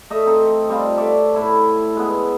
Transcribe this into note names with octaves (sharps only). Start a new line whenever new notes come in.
A3 D#5 E5
C4 D#4 A4 C6
G3 C4 F4
A4 C#5 D5 E5
A2 E4 B5
G#3 B3